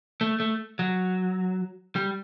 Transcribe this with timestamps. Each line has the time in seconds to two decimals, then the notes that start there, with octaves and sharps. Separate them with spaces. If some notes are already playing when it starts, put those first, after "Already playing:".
0.21 A3
0.40 A3
0.79 F#3
1.96 G3